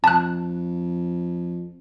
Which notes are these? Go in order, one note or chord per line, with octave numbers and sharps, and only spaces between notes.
F2 A5 F#6